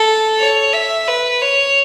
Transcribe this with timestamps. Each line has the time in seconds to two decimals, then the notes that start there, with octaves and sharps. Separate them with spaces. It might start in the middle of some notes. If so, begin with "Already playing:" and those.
Already playing: A4
0.40 C#5
0.73 E5
1.08 B4
1.42 C#5